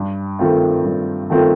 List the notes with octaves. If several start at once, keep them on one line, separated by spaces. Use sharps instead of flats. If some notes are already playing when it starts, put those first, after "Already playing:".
Already playing: G2
D#3 A3 C4 F4
G2
D#3 A3 C4 F4